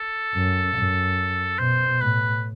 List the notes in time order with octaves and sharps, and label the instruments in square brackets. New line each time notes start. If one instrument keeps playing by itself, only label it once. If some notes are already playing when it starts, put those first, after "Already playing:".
Already playing: [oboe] A4
[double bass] F#2
F#2
[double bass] B2 [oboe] C5
[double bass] A2 [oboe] B4